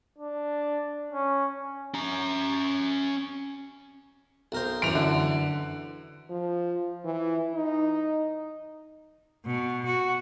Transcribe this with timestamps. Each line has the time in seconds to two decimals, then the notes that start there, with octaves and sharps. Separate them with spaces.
0.18 D4
1.12 C#4
1.94 C#4 A#5
4.52 B1 A#4 C5
4.82 F#2 E3 D7 F7
4.95 D3
6.30 F3
7.05 E3
7.55 D#4
9.46 B2
9.86 F#4